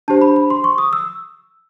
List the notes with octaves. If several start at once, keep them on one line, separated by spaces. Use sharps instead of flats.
D4 G4 C5 A5
B5
B5
C6
C#6
D#6
E6